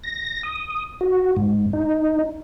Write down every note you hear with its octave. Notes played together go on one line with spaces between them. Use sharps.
A#6
D#6
F#4
G#2
D#4